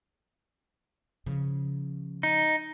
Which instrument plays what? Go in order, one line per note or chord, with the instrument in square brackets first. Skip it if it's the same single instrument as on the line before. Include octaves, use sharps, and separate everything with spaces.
[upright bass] C#3 F3
[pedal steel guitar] D#4